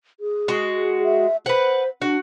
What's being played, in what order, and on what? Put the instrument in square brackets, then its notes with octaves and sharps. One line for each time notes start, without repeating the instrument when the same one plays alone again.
[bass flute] G#4
[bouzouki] G#3 F#4
[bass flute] E5
[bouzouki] B4 F#5 [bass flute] C5
[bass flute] D4 [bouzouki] F#4